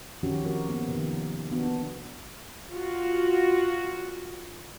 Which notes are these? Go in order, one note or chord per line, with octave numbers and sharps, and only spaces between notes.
D#3 F3 F#3 C#4 F#4 G4
C4 F#4 A#4
A#3 B3
C3 D#3 F3 D#4 G4
B3 D4 F#4
F4 F#4